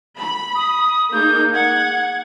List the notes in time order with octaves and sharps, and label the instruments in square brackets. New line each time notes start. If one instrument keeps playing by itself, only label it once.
[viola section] B5
[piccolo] D#6
[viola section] A#3 D#4 G#4 [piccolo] G6
[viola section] F#5 [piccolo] G#6